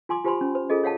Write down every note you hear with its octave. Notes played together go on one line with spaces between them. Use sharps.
F4 G#5 C6 D6
F4 G4 C5 G#5 B5 C6
C#4
C5
F4 G#4 A4 D#5
C#5 F5 F#5 A5